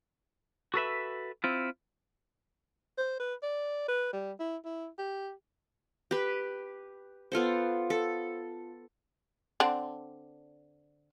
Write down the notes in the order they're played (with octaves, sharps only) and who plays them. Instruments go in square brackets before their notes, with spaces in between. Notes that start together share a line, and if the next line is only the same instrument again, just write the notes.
[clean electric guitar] F#4 A4 B4 E5
C4 E4 F4
[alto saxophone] C5
B4
D5
B4
G3
E4
E4
G4
[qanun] G4 B4
B3 F4 A4 C5
A4
[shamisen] D3 C4 D4